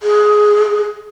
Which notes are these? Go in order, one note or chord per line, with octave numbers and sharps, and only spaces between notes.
G#4